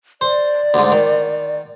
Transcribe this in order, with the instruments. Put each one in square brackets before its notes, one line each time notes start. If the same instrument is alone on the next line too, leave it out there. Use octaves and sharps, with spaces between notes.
[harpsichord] C5 [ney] D5
[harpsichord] D2 G#2
D#3